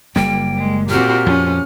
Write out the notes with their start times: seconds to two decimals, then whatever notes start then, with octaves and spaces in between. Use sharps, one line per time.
0.16 F#1 G3 A#3 G5
0.57 G#3
0.89 A#2 C4 F#4 G4 F6
1.27 F2 F3 C#4